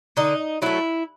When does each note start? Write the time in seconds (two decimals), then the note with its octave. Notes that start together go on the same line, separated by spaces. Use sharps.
0.17 D3 D#4
0.62 F#3 A3 E4